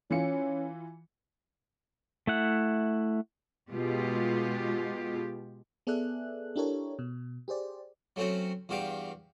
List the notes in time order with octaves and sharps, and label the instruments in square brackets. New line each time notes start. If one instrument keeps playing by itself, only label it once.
[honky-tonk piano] E3 F4 C#7 [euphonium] C#4
[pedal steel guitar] A3 E4 F#5
[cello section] B2 G#3 F4 G4
[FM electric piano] B3 G#4 A4 D5 E5 F#6
D4 E4 G4 A4 A#4 C#5
B2
G4 G#4 C5 D5
[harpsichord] F#3 A3 C4 C#4 F#4
E2 G2 F#4 G4 F5 G5